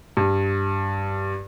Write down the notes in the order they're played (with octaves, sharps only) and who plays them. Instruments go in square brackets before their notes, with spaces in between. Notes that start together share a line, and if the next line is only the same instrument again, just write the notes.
[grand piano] G2